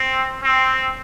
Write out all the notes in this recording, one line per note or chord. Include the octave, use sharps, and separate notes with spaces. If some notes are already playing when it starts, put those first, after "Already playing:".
Already playing: C4
C4